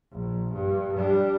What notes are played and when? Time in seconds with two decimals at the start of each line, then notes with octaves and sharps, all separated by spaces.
0.12 A#1
0.53 G2
0.97 G3 D4